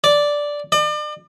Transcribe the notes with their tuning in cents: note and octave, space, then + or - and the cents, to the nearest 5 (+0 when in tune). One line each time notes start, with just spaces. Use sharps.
D5 -5
D5 +40